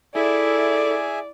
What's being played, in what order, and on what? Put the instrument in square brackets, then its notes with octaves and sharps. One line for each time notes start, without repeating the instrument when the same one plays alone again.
[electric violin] E4 [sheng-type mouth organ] G#4 E5 G#5 [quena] A4 [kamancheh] D5